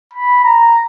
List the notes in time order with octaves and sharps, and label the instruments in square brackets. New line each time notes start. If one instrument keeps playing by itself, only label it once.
[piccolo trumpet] B5
A#5